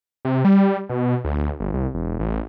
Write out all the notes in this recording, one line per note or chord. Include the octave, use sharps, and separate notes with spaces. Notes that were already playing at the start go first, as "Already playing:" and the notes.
C3
G3
B2
D2
G1
C2
E1
A1